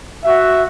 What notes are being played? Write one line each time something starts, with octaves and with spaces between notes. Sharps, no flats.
F#4 E5